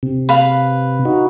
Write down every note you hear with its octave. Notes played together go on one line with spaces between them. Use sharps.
C3
B4 F5 B5
D#4 F#4